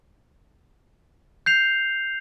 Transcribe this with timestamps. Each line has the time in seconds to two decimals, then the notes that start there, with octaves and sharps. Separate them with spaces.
1.46 G6 C7 F7